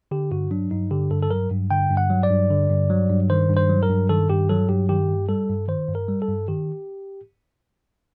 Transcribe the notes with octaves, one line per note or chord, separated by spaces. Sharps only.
D3 G4
G2 F#4
F#3 D4
G2 D#4
D3 G4
G2 A4
A4
F#3 A#4
G2
D3 G5
G2
F#5
F#3
D5
G2
D3
G2
F#3
G2
D#3 C5
G2
C5
F#3
A#4
G2
D#3 A4
G2 G4
F#3 A4
G2 G4
D#3 G4
G2
G3 A4
G2
D#3 C5
G2
A#4
G3
A4
G2
D#3 G4